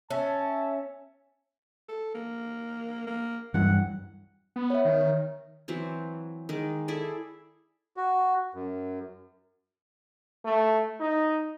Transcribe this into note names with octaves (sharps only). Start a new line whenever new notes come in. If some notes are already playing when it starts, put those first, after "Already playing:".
C#4 E5 A5
A4
A#3
A#3
G2 E3 F#3 F#5
B3
C#5 E5
D#3
E3 F#3 C4
D#3 G#3 D6
E4 G#4 A4 D5
F#4
F#2
A3
D#4